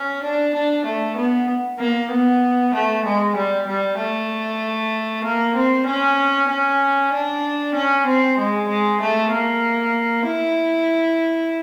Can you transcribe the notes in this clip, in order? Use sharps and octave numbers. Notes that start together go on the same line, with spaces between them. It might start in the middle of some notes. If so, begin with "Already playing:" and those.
Already playing: C#4
D4
D4
A3
B3
A#3
B3
A3
G#3
G3
G3
A3
A#3
C4
C#4
C#4
D4
C#4
C4
G#3
G#3
A3
A#3
E4